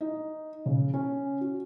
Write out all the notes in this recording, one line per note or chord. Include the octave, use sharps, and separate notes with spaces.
D#4
C#3
C#4
F#4